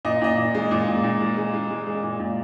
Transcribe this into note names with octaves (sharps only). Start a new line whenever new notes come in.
A#2 D#5
A#2 D#5
A#2
G#3
A#2
A#2
A#2
G#3
G#3
G#3
G#3
G#3
A#2
A#2